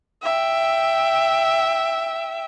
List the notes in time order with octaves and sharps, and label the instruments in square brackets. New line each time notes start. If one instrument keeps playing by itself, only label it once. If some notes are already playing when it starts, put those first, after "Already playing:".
[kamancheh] E5 G5